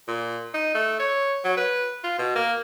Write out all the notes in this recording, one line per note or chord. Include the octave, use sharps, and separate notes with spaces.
A#2
D#4
A3
C#5
F#3
B4
F4
B2
A#3